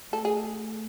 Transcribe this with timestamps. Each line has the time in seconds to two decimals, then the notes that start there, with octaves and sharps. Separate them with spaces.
0.13 A3 A4
0.25 G#4